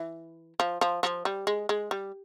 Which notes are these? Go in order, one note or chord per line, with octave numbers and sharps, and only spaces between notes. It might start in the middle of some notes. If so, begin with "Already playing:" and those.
Already playing: E3
F3
F3
F3
G3
G#3
G#3
G3